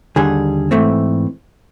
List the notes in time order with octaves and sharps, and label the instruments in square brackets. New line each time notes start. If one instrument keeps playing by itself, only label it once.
[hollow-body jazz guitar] D#2 D3 G3 G#4
G#2 E3 A3 C4